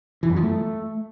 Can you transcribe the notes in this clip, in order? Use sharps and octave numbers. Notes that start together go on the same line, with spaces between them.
E3
F#2
F3
A3